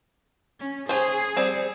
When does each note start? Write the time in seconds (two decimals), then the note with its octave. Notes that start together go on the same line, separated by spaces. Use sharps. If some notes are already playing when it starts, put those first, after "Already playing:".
0.60 C#4
0.89 C#4 G#4 C5
1.37 G3 C4